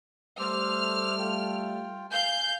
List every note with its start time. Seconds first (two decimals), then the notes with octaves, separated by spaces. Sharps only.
0.39 G3 A3 C5 D6 E6 F6
1.19 F4 G5
2.11 F5 G#5 G6